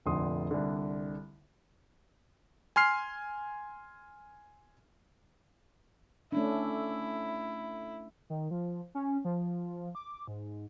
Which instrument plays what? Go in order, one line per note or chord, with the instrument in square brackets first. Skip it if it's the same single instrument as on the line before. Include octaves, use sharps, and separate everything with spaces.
[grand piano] F1 A#1 D3 C6 D#6
C2 D3
[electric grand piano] G#5 C6 F6 C7
[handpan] A3 C#4 D4 [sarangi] E4
[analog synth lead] D#3
F3
C#4
F3
D6
G#2